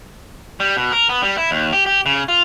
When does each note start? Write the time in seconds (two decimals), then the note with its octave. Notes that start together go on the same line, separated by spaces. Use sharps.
0.60 G3
0.77 B2
0.92 A#4
1.09 B3
1.23 G3
1.38 E4
1.51 D#2
1.73 G4
1.86 G4
2.06 C#3
2.28 F4